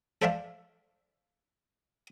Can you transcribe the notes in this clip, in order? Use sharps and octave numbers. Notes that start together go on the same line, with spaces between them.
A4 C5 D5 E5 F5 A5